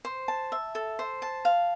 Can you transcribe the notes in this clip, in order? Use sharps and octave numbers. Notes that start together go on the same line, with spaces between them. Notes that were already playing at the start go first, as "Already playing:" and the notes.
C5
A5
E5
A4
C5
A5
F5